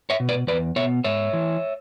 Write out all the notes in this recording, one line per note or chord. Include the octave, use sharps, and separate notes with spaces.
C#5 E5
B2
B4 D5
E2 B4 D5
B2 C#5 E5
G#2 C#5 E5
E3